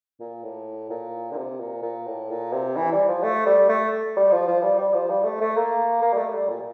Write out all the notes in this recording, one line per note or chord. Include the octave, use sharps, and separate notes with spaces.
A#2
A2
A#2
D3
C3
A#2
A#2
A2
A#2
C3
E3
G3
F3
A3
G3
A3
G3
F3
F3
G3
G3
F3
G3
A3
A3
A#3
A#3
G3
A3
G3
A#2